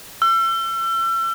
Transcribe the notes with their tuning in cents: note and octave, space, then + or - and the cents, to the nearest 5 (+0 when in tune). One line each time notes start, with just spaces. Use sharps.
E6 +35